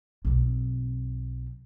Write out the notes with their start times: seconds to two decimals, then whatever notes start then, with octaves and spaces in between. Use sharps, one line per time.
0.25 B1 C4